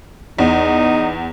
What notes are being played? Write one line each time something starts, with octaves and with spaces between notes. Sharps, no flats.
E2 D#4